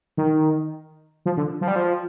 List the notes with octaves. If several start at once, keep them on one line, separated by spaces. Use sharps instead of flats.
D#3
F3
D3
F3
G3
F3